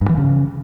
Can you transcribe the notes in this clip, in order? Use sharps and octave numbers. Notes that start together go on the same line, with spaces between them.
G2
E3
C#3